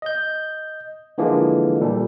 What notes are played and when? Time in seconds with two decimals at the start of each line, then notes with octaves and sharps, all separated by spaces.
0.02 D#5 G6
1.18 D3 E3 F3 G#3 A#3
1.81 A#2 G3 A4